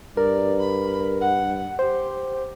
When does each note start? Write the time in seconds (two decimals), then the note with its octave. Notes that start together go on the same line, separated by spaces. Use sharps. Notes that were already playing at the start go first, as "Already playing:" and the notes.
0.17 G2 A#4 D5
0.60 B5
1.21 F#5
1.79 G4 C5